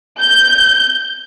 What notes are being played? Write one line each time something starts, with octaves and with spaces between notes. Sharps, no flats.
G6